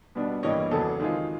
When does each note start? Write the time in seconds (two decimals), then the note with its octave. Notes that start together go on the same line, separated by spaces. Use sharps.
0.15 B2 G3 B3 D4
0.43 G2 E3 G3 A#3 C#5 D#5
0.71 E2 C#3 F#3 B3 A4
0.99 D#3 G#3 C4 F4